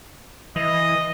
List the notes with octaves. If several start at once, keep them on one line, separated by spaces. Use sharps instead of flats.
E3 D#5